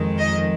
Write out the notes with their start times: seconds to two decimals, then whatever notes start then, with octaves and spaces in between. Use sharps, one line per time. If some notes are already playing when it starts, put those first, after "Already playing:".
Already playing: F2 D#3 G#3
0.19 D#5